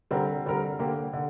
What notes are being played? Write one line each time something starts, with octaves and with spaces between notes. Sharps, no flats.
D3 G3 C4 A#4
D3 G3 C4 A#4
D3 A#3 G4
D3